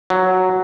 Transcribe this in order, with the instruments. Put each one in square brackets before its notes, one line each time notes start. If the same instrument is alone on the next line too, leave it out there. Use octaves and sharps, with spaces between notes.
[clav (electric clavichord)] F#3